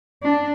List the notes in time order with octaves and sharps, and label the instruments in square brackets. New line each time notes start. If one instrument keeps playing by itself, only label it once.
[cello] D4